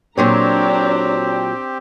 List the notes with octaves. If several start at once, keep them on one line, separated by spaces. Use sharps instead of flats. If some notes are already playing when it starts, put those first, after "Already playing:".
A#2 F#3 C4 D4 G4 C#5 A#5